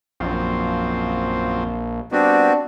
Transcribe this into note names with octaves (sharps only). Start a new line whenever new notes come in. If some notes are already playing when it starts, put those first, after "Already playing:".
A#1 F#2 F3 C4
G3 B3 C4 D4 F#4